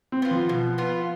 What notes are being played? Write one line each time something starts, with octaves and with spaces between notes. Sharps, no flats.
C4
B3 F4
F3
B2
B3 F4